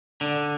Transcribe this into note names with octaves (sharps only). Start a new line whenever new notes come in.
D3